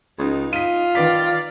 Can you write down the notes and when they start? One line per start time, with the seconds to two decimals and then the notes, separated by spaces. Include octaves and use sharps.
0.19 C#2 D#4
0.53 F4 B6 D#7
0.95 D#3 B4 D5 B6